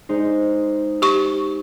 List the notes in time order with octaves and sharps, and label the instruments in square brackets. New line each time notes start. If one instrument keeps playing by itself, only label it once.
[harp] G#3 D#4 C5
[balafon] G4 C#6